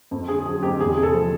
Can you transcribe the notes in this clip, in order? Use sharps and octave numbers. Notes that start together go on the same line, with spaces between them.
F2
D3 G#4
F#3 G#4
F2 G4
E2 G#4
C3 G#4
A4
F3